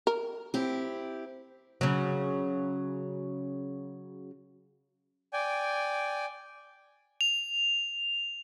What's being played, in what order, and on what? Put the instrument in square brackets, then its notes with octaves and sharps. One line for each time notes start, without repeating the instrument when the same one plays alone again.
[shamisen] A#4
[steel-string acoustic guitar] C4 E4 G4
[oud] C#3 F#3
[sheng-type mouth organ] D5 G5 G#5
[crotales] F7